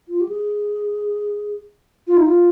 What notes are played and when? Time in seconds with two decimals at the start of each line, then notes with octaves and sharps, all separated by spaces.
0.09 F4
0.21 G4
0.29 G#4
2.07 F4
2.17 D#4
2.26 F4